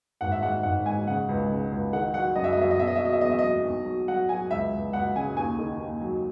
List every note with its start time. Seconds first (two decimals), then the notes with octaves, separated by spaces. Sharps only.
0.21 G#1 F#5
0.32 E5
0.42 G#2 F#5
0.63 G#1 F#5
0.85 G#2 G#5
1.07 C#3 F#5
1.29 C#2
1.49 C#3
1.72 C#2
1.93 D#3 F#5
2.14 F#3 F#5
2.35 F#2 D#5
2.44 E5
2.53 D#5
2.58 F#2 E5
2.71 D#5
2.79 B2 E5
2.88 D#5
2.95 E5
3.00 F#3 D#5
3.13 E5
3.21 E2 D#5
3.31 E5
3.39 F#3 D#5
3.65 B1
3.86 F#3
4.08 F#3 F#5
4.29 F#3 G#5
4.50 C#2 E5
4.73 C#2
4.93 C#2 F#5
5.16 C#3 G#5
5.37 D#2 G#5
5.58 D#3
5.79 D#2
6.01 F#3